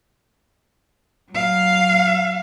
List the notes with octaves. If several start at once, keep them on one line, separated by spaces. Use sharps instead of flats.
F#3 F5